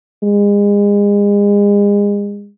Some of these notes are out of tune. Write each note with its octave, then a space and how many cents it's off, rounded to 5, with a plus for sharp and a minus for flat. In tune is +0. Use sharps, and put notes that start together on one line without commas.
G#3 -35